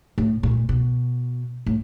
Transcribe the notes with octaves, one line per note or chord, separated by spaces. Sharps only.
A2
A#2
B2
A2